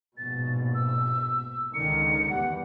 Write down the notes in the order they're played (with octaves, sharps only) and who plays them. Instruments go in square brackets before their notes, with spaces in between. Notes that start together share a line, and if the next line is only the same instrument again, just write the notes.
[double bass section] A#1 G#2 B2 [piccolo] A6
[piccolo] E6
[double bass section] C#2 D3 D#3 [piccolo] C#7
[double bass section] E2 G3 [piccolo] F#5